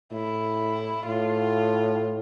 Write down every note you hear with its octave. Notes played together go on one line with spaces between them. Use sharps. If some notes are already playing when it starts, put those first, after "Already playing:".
A2 E4
A2 F4